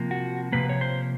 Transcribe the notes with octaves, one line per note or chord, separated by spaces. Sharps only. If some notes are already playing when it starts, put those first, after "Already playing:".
Already playing: C3 F3 A#3
F#4
C3 F3 A#3 B4
C#5
C5